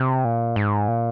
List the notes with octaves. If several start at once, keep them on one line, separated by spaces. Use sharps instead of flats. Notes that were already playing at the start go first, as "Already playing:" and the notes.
Already playing: C3
A#2
G#2
A#2